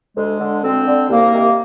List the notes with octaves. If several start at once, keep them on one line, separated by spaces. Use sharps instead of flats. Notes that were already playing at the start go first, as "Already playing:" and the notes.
D2 G#3
D3
D2 C4
D3
C2 A#3
C3 D#3